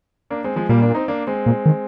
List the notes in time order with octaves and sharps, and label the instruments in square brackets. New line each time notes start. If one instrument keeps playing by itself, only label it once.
[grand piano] A#3 D4
G#3 C4
F3 G#3
[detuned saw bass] A#2 [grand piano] G3 A#3
[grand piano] A#3 D4
C4 D#4
A#3 D4
G#3 C4
[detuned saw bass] A#2
D#3